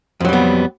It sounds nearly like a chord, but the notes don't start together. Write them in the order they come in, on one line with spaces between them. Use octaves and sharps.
F2 F#3 G3 B3